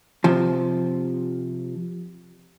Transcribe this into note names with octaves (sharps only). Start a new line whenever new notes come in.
C3 F3